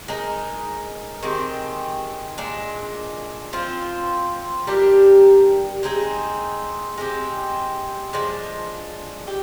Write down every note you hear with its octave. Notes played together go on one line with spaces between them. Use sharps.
G#3 D#4 A#4
D#3 G#3 C4 G4
A#2 G#3 D4
F3 C4 F4
G3 D4 G4 A#4
G#3 C4 D#4 G#4
G#3 C4 G4
F3 G#3 D4
G4